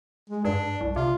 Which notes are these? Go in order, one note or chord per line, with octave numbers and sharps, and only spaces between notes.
G#3
G2 D4
C2
C3 F4